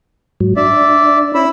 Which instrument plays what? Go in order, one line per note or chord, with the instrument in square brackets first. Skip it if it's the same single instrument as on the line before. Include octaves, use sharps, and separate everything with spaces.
[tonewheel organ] G#2 F#3
[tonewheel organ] D4 [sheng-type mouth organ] D5 E5
[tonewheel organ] C#4 [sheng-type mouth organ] E4 B5 E6